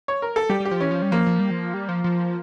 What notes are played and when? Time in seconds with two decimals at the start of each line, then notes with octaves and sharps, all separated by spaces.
0.08 C#5
0.22 A#4
0.36 A4
0.50 G3 G4
0.60 G3
0.65 G4
0.71 F3
0.80 E3 C#4
0.91 F3
1.02 G3
1.11 F3 A#3
1.27 F3
1.39 G3
1.51 F3
1.74 G3
1.89 F3
2.04 F3